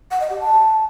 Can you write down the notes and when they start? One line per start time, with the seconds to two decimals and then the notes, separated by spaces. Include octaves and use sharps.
0.11 F#5
0.20 D#5
0.30 G4
0.40 A5